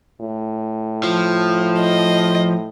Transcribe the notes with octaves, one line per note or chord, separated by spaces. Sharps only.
A2
F3
D#5